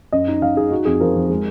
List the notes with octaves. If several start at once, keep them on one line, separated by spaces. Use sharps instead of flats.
F#2 D#5
D#4
F#2 F5
D#4 G#4
D#4 F#4
F2 G#4
F3 A#4
F2
G#3